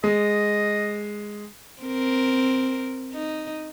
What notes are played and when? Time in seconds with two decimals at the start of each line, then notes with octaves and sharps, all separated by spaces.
0.04 G#3 D#5
1.82 C4 A#4
3.13 D#4